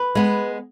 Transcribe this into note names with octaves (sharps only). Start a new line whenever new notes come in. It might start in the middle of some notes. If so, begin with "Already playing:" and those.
Already playing: B4
G#3 B3